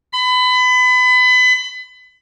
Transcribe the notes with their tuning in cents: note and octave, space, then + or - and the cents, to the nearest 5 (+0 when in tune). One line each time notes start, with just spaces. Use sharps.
B5 +30